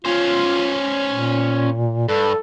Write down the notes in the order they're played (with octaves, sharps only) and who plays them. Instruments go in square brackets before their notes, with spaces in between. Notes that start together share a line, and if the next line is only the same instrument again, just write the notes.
[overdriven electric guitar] C#4 C5 [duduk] F4
[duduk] A#2
[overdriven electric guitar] G2 [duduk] A4